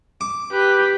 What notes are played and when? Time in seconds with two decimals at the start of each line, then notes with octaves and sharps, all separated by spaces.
0.21 D6
0.52 G4 B4